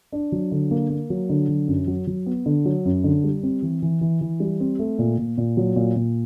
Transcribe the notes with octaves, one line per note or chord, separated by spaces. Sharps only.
D4
F#3
D3
A#3
A#3
F#3
D3
F#3
F#2
F#3
F#3
B3
D3
F#3
F#2
D3
G3
C4
E3
E3
E3
E3
G3
C4
A3
A#2
A#2
A#2
F#3
A#2
A#2